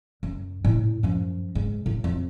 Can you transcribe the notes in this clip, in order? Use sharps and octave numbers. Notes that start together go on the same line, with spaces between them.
F#2
A2 E4
F#2 F3
G#2
A2
F2